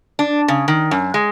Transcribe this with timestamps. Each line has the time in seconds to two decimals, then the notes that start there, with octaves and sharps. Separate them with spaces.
0.19 D4
0.48 C#3
0.68 D#3
0.91 F#2
1.14 G#3